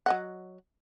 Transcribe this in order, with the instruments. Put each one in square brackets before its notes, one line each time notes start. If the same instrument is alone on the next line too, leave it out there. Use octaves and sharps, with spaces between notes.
[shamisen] F#3 D#5 F#5